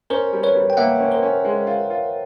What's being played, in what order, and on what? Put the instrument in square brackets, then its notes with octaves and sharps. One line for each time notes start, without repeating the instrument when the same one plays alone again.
[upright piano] C#4 [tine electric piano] A#4 C5
[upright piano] G3
[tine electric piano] B4 C#5
[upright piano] G3
[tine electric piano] G5
[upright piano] A#3 [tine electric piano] E5 F#5
[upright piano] C#4
[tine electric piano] A#4 C5
[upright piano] C#4
G#3
F4
F4